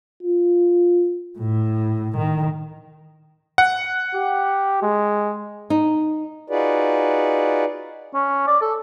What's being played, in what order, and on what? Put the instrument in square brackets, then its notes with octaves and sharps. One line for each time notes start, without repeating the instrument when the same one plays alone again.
[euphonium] F4
[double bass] A2
D#3
[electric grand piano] F#5
[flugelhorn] G4
G#3
[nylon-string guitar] D#4
[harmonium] D#4 F4 F#4 G#4 B4 D5
[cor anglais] C#4
D5
A4